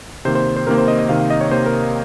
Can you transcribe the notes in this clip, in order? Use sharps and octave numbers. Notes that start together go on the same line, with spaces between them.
C3 D#3 A#3 C5
C5
C5
C3 D#3 A#3 A#4
C5
D#5
D#5
C3 D#3 A#3 F5
F5
D#5
C#5
C3 D#3 A#3 C5
A#4